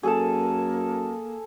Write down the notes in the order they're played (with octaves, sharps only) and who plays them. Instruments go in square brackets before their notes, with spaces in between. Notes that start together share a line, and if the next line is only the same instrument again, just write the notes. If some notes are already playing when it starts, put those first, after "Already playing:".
[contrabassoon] F#2 [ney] A#3 [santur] G#4 A4 A5